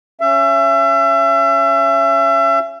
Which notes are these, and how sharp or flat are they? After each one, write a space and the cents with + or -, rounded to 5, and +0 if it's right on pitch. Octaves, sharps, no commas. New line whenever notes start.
C#4 +0 E5 +35